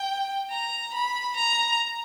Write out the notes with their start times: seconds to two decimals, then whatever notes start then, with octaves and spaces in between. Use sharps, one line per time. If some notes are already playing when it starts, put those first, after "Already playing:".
Already playing: G5
0.50 A#5
0.93 B5
1.36 A#5